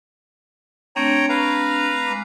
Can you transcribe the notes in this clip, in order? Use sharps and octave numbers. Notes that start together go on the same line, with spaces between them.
A3 C4 D4 C#5 G5 A#5
B4 F5 A#5
G#3 B5 D6